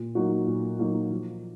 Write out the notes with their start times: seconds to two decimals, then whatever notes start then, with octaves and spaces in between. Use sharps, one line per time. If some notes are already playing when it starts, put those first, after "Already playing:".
Already playing: A#2
0.15 F#3 A#3 D#4 F#4
0.47 A#2
0.79 F#3 A#3 D#4 F#4
1.11 F3